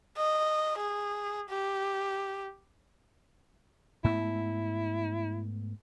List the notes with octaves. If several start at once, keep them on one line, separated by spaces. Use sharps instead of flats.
D#5
G#4
G4
G#2 A3 B3 E4